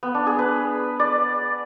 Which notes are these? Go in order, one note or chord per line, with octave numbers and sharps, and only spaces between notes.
B3
D4
G#4
B4
D5